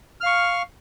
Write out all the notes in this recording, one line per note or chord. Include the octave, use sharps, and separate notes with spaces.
F5 C#6 F6